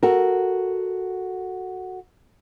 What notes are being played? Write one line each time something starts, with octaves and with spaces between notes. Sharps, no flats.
F#4 A4 A#4